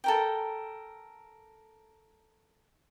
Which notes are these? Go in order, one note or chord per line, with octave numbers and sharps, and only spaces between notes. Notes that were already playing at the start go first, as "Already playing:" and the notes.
A4 A#4 G5